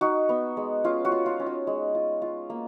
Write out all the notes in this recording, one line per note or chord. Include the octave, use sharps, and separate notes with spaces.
D#4 F#4
B3
G#3
C#4 F4
F#4
F4
F4
C#4
F#4
G#3
F4
F4
A#3